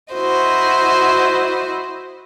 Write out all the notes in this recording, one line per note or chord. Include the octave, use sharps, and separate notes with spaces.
E4 F#4 C5 D#5